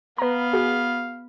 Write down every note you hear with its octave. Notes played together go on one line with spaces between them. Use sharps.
B3 B4 F5 A#5
F#4 G#4